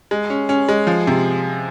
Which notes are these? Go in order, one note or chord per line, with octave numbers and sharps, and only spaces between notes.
G#3
C#4
C#4
G#3
F3
C3